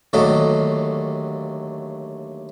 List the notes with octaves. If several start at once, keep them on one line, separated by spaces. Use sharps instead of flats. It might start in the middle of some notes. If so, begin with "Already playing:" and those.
D#2 D3 F#3 A3 D#5 F5